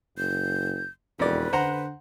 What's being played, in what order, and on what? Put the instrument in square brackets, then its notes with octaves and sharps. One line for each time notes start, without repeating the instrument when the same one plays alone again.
[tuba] F#1 [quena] G6
[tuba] E1 [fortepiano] F2 D5 [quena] B4
[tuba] D3 [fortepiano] C5 F#5 A#5